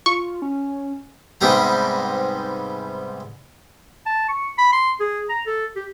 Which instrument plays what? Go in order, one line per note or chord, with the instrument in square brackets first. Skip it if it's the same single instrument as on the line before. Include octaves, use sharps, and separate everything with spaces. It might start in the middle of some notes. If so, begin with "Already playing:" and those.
[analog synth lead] F4 [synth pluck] C#6
[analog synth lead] C#4
[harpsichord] G#2 C3 G3 B3 G4 A#5
[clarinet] A5
C#6
B5
C6
G#4
A#5
A4
G4